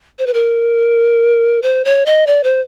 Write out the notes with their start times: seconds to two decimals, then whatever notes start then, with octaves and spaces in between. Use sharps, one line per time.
0.19 C5
0.26 B4
0.34 A#4
1.62 C5
1.85 C#5
2.06 D#5
2.27 D5
2.44 C5